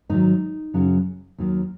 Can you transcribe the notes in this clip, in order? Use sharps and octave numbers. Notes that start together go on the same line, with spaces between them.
G#2 D#3 F#3 D#4
F#2 C#3 F#3
D#2 D#3 F#3